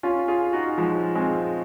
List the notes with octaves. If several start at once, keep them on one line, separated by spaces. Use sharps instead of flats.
C#4 F4
F4 G#4
D#4 F#4
F3 G#3
G#3 C4